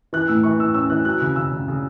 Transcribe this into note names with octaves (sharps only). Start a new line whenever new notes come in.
E3 F#6
A2 E6
E3 C#6
A2 E6
C#4 E6
E3 F#6
F#3 F#6
C#3 F#6
C#3 E6
C#3
C#3